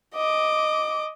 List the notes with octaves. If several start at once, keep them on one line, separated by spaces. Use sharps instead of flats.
D#5 D6